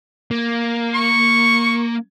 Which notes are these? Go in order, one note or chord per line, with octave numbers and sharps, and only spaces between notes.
A#3
C#6